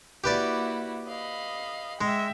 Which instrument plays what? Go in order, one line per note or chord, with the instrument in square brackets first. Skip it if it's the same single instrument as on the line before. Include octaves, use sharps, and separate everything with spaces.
[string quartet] A#3 E4 F#4 [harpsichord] G4 B4 D5
[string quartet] D#5 F5 B5
[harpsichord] G#3 [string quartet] E5 G5